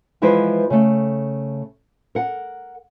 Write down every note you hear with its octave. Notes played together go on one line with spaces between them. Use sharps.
E3 F3 G#3 E4 B4 C5
C#3 A3
A#4 F#5